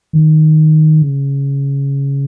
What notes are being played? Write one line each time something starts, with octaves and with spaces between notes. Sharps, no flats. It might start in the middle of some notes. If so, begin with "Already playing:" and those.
D#3
C#3